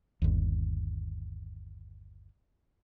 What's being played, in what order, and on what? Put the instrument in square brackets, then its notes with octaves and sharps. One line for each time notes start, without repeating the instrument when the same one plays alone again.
[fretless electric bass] G1 D#2